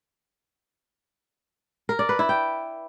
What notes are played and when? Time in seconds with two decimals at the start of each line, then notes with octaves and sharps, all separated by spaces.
1.89 A#4
1.99 D5
2.09 B4
2.19 E4
2.29 G5